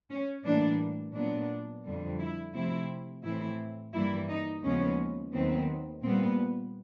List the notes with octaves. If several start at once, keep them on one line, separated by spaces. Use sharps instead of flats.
C#4
A2 E3 G3 A#3 D4
A#2 F#3 B3 D4
F2 D3 G3
E4
C3 F3 A3 C4 E4
A2 E3 A3 C4 E4
G2 E3 G3 A#3 E4
D#4
D#2 C#3 F3 G#3 B3 C#4
D#2 D#3 F#3 B3 C4
A#2 G3 B3 C4